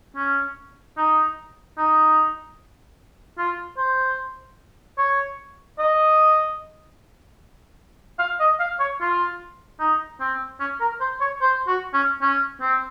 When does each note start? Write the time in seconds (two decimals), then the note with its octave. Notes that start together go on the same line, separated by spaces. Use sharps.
0.16 C#4
0.97 D#4
1.77 D#4
3.38 F4
3.77 C5
4.98 C#5
5.79 D#5
8.19 F5
8.40 D#5
8.59 F5
8.80 C#5
9.00 F4
9.80 D#4
10.20 C4
10.60 C#4
10.80 A#4
11.00 C5
11.20 C#5
11.41 C5
11.67 F#4
11.94 C#4
12.22 C#4
12.61 C4